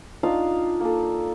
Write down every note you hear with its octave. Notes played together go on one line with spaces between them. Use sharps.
D4 D#4 F4 F5
A#3 A4